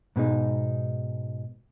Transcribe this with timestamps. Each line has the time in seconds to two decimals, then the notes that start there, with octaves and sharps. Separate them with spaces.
0.16 G#2 B2 G#3 D#4